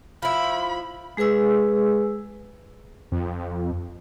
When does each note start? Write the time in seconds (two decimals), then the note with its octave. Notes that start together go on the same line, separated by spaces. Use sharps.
0.22 F3 E4 B5
1.17 G#3 G#4 B4 G#5 E6
3.12 F2